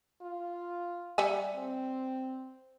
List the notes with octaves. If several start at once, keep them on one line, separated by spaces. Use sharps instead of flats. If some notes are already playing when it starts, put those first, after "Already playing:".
F4
G3 E5 G#5
C4